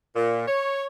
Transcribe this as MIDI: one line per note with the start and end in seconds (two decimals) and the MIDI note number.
0.15 0.44 46
0.47 0.85 73